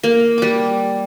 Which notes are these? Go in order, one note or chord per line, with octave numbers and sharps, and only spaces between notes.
A#3
G3 D6